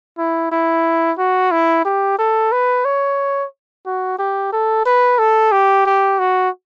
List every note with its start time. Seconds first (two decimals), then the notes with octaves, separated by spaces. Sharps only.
0.18 E4
0.52 E4
1.18 F#4
1.52 E4
1.85 G4
2.19 A4
2.52 B4
2.85 C#5
3.86 F#4
4.19 G4
4.52 A4
4.85 B4
5.18 A4
5.52 G4
5.86 G4
6.19 F#4